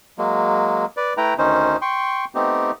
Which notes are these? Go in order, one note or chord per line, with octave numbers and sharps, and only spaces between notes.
F#3 G#3 A#3
B4 D5
A3 E4 B4 G5 A#5
D2 D#3 C#4 D#4 C5
G5 C6 C#6
A3 B3 C4 D#4 G4